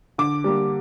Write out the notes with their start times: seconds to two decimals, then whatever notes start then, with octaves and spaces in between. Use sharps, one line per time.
0.18 D3 D6
0.44 G3 A#3